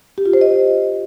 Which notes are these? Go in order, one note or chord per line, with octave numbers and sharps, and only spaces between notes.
G4
F4
C5
D#5